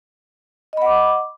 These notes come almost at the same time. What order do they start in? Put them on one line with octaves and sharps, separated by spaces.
D#5 B5 F#5 D6